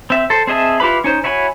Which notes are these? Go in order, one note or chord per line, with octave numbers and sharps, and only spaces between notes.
C4 E5
A4 C5
C4 G#4 D#5 E5 A5
E4 F4 G4 B4 B5
C#4 D#4 C5
E4 F#4 C#5 G#5 B5